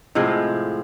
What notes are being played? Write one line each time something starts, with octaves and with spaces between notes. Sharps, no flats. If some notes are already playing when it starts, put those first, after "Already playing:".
A2 C3 F3 G#3